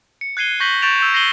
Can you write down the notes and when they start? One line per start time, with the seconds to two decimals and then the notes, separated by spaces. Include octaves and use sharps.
0.21 C#7
0.37 F#6 G#6 C7 D#7 G7
0.60 C#6 G6 A#6 B6 F#7 G7
0.82 C#6 G6 A6 D7 E7 F7
0.99 E6 G6 F7
1.14 A#6 C7 D#7 F#7 G7